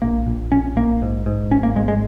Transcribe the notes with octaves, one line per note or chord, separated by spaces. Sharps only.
A#1 A#3
A#1
A#1 C#4
A#1 A#3
G#2
G#2
G#1 C#4
A#3
G#2 G#3
G#3